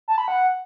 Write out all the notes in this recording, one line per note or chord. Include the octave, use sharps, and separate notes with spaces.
A5
B5
F#5